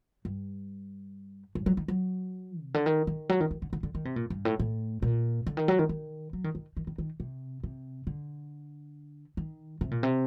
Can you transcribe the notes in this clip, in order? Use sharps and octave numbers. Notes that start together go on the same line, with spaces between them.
G2
G2
F#3
D#3
F#3
C3
D3
D#3
D#3
F#3
D#3
D#3
D3
D3
D3
D#3
C3
A#2
G2
A2
A2
A#2
D3
D#3
F#3
D#3
D#3
F#3
D#3
D#3
D#3
D#3
D#3
C3
C3
D3
D#3
C3
A#2
C3